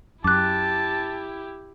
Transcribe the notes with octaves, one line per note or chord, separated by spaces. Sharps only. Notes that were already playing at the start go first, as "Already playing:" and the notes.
F#2 E4 G4 A5 D6 F#6